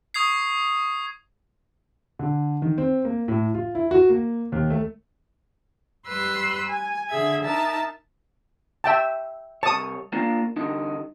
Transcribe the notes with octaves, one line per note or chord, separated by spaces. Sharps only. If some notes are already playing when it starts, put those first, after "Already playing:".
C#6 D#6 G#6 C7
D3
D#3
C4
A#3
A2
F4
E4
F#4
A#3
D#2
A3
G3 B4 C6 E6 F#6
G#5
D3 G#4 E5 G#6
D#4 A#4 E5 A5
E5 G5 A5
C2 C#5 A5 D#6
A#3 D4 F4
G2 D3 D#4